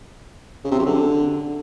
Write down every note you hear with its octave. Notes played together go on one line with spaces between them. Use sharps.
C#3
C3
F#2
D3